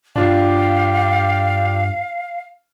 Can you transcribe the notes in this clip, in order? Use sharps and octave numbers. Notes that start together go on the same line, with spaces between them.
G2 D4 F4 G4 F5